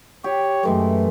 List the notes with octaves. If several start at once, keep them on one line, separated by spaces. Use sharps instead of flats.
G4 C#5
F#2 E3 G#3 A3